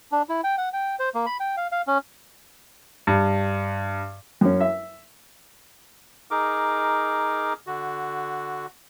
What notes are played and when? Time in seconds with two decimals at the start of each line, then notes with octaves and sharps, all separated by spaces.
0.12 D4
0.29 E4
0.44 G5
0.58 F#5
0.73 G5
0.99 C5
1.15 A#3
1.26 B5
1.40 G5
1.57 F5
1.72 F5
1.87 C#4
3.07 G2
4.41 F#2 C#4
4.60 E5
6.31 D#4 G#4 A#4 D6
7.67 D3 F#4